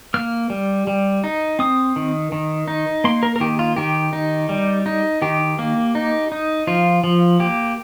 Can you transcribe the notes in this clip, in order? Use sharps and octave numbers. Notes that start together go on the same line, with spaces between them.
A#3 F6
G3
G3
D#4
C4 D#6
D#3
D#3
D#4
A#3 C6
A#4
A#4
D#3 G4
F4
D#3 G4
D#4
G3
D#4
D#3 G4
A#3
D#4
D#4
F3 F4
F3
A#3 G4